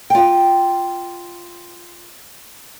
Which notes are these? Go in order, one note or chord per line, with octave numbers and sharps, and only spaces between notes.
F4 G5